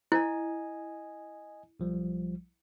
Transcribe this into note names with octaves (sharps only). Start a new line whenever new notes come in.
E4 D#5 G#5
B1 F3 G3